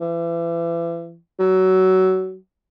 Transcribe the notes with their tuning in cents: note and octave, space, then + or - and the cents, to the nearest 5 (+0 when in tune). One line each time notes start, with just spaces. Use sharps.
E3 +35
F#3 +20